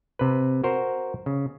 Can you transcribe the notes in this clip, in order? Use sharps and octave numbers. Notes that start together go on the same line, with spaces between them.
C3 B4
F#4 A#4 C5
C#3